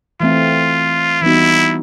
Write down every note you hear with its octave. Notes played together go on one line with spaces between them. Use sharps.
E3 A3 C4 F4
E3 G3 B3 D#4 E4 F#4